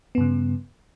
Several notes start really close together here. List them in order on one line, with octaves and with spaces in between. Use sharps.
B3 G2 C#3